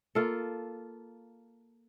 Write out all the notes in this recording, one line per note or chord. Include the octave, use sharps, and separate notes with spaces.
A#3 F4 A4